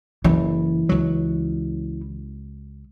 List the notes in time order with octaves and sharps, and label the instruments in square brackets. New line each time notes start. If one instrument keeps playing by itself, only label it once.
[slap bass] F#1 [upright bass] E3
[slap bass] C#2 F#3